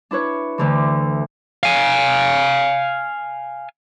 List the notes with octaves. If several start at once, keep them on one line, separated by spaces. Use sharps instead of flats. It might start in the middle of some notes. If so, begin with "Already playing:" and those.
D4 E4 B4 C#5
D2 D3 E3
F5 G#5